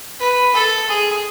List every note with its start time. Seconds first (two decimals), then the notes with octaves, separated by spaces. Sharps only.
0.20 B4
0.54 A4
0.89 G#4